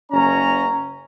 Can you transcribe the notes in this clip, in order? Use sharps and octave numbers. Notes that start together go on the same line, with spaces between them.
F#1 C#4 A#5